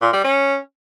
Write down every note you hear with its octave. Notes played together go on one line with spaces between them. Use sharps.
A#2
G3
C#4